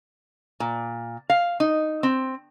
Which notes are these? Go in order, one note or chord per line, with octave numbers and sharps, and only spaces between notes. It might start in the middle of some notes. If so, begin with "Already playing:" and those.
A#2
F5
D#4
C4